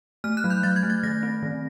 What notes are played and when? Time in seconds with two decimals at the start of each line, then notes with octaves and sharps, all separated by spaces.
0.24 A3 F6
0.37 F#6
0.44 F#3
0.50 G6
0.63 F#3 A6
0.76 G#6
0.83 A3
0.90 A6
1.03 D#3 A#6
1.23 C4
1.43 D#3